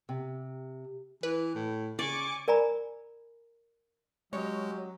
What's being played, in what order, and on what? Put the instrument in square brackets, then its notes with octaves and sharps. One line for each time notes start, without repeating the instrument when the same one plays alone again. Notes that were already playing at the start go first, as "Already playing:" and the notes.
[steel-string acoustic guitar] C3
[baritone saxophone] E3 [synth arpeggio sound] B4
[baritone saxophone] A2
[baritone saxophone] C#3 [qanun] D5 [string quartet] G#5 C#6 D6
[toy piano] A#4 D5 G#5 A#5 B5
[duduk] F#3 [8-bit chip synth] G#3 [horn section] C#4 G4 D#5 [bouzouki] C#5